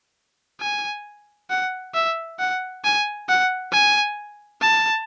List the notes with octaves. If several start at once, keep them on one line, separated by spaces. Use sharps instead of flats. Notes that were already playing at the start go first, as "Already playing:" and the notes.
G#5
F#5
E5
F#5
G#5
F#5
G#5
A5